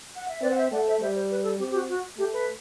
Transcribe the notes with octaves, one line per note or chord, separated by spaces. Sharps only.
F#5
E5
C4 B4 D5
F#5
C5 E5
A3 D5 F#5
C5 E5
G3 C5 E5
C5
B4
A4
C4 G4
G4
F#4
F#4
A3 G4
B4